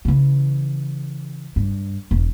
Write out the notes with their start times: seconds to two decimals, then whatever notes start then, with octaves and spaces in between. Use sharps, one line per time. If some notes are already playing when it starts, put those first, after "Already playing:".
0.05 C#3 E3
1.56 G2
2.11 E1